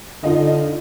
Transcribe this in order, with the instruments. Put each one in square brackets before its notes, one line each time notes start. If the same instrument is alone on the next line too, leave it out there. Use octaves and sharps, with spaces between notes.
[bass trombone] D3 [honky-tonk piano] D#4 F4 D#5